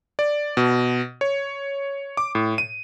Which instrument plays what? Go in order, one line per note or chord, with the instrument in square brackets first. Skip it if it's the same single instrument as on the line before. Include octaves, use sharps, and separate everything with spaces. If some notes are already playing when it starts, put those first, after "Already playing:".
[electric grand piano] D5
B2
C#5
D6
A2
D#7